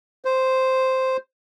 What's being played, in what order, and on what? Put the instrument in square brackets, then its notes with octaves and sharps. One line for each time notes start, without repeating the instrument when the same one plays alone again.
[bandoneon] C5